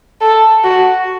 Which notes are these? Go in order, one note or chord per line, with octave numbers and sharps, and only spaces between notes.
A4
F#4